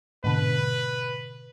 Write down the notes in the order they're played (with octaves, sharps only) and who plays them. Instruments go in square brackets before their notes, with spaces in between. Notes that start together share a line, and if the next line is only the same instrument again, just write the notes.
[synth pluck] G#2 B2 D3 [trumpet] B4